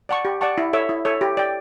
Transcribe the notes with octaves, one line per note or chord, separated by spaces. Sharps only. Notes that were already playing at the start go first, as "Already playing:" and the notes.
D5 F#5 A5 C#6
G4
D5 F#5 A5 C#6
E4
A4 C#5 E5
E4
A4 C#5 E5
G4
D5 G5